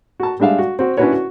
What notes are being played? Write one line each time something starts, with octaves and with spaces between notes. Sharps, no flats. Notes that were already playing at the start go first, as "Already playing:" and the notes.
F#4 A5
G3 G#3 D4 E5 F5
F#4
C4 F#4
C#4 D4 E4 F#4 B4 C#5
F#4